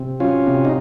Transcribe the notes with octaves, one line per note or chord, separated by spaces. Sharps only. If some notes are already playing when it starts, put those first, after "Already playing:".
Already playing: C3 C4
F#3 C#4 F4
C3
D#4